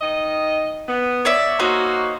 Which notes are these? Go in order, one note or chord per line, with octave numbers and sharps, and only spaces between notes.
D#3 D#5
B3
C#5 D5 E5
A#3 D#4 F#4 C5 C#5